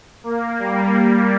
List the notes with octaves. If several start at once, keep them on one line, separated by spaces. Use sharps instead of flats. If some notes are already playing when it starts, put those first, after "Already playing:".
A#3
G3